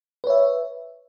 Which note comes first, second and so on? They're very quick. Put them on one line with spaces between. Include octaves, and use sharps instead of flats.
B4 C#5 E5